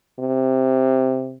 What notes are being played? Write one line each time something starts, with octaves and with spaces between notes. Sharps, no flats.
C3